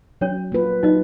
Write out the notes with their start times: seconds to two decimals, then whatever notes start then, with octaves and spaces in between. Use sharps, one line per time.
0.21 F#3 C#4 C#5
0.52 A#3 F4 B4
0.83 F#3 D#4 D#5